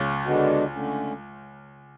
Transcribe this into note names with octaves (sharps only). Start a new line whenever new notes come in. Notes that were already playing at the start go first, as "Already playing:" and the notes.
Already playing: C#2 C#3
D3 G#3 B3 D4 F#4
D3 A3 C#4